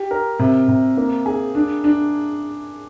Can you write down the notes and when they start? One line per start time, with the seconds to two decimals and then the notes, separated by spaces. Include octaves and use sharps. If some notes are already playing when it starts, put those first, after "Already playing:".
Already playing: G4
0.11 A#4
0.39 C3
0.68 C3
0.97 A#3
1.26 G#4
1.55 D4
1.84 D4